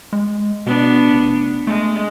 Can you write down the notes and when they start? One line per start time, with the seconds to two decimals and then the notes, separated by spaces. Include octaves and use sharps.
0.13 G#3
0.66 B2 B3 D4
1.14 F1
1.67 G#3 A3